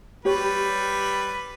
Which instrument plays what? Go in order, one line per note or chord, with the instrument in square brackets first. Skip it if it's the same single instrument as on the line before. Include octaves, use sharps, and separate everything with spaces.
[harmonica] G3 B4 [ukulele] G4 C#5